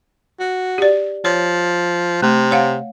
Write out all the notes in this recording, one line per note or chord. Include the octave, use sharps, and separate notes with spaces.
F#4
G4 D5
F3 C#5
C3 A3
C#5 F5 F#5